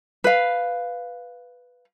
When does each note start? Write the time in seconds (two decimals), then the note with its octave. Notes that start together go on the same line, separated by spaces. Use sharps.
0.24 B4 F5